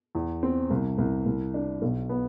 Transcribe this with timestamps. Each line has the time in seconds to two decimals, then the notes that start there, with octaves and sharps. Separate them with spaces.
0.15 E2
0.43 C4
0.70 C2
0.98 C2
1.26 C2
1.54 D4
1.82 B1
2.09 B3